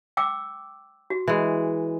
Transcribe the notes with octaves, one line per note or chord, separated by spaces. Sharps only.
G5 D6 E6
F#4
E3 G#3